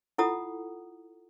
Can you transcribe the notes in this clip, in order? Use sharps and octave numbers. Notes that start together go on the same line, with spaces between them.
E4 F4 A4 F#5 A#5 D#6